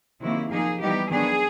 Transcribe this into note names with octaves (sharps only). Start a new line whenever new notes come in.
C3 D#3 F#3 A#3 E4
F3 A#3 D#4 G#4
E3 G3 B3 D#4 G4
D#3 F#3 B3 D4 G#4